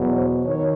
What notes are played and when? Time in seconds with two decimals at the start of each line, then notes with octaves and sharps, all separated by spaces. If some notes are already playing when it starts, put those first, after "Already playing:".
Already playing: E2 B2 F#3
0.14 C5
0.45 D#3 C#5